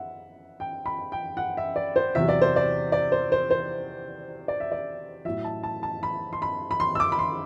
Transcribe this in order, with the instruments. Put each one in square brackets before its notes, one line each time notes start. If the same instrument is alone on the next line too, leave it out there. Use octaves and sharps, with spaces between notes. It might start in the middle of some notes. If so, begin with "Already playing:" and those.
Already playing: [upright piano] E5 F#5
G5
B5
G5
F#5
E5
D5
C5
E2 C3 F#3 E5
D5
C5
D5
D5
C5
C5
C5
D5
E5
D5
A2 F#3 E5
A5
A5
A5
B5
C6
B5
B5
C6
E6
D6
B5
C6